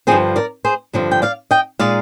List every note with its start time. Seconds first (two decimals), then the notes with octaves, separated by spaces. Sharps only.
0.07 G2 D3 F3 C4 G#4 C5
0.36 A#4 D5
0.65 G#4 C5
0.93 G2 D3 F3 C4
1.11 G5
1.22 D5 F5
1.51 D#5 G5
1.79 A#2 G#3 D#4 D5 F5